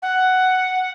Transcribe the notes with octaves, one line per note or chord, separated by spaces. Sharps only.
F#5